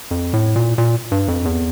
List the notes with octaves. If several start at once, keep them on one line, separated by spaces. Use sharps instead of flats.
F2
A2
A#2
A#2
G2
F2
E2